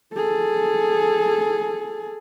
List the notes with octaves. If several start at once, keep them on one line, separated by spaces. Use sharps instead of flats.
G#4 A4